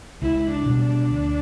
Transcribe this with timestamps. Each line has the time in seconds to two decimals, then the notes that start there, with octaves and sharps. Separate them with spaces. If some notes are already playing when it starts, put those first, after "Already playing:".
0.22 C#2 E4
0.52 D4
0.66 B2 G3
0.81 D4
1.10 D2